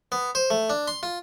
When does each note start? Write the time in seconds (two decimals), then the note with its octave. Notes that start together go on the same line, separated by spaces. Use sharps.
0.12 B3
0.35 C5
0.50 A3
0.70 D4
0.88 C6
1.03 F4